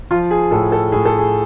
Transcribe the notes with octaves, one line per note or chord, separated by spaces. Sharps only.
F3 F4
G#4
A2 A4
A4
A2 G#4
A4
G#4